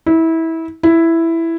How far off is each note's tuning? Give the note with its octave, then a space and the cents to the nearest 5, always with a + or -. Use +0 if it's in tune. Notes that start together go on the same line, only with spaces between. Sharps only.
E4 -20
E4 +5